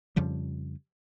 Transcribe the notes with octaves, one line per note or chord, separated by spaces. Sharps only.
F2 C#3 F3 G3